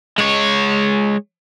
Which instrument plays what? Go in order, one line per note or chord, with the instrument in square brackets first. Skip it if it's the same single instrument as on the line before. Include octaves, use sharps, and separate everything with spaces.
[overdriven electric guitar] G#3 C#5